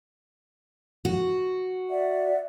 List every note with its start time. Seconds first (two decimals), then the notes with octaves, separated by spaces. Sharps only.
1.05 F#4
1.89 D5 E5 F#5